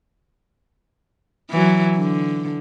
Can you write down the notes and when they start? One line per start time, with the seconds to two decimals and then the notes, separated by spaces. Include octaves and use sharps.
1.51 E3 F#3
1.97 D3